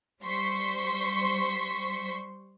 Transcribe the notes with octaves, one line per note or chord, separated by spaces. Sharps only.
G3 C5 C6 C#6 B6